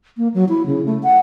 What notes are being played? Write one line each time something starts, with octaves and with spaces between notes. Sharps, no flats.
A#3
F#3
E4
C#3
A3
F#5